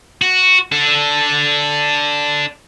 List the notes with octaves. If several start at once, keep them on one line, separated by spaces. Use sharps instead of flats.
F#4
D4 A4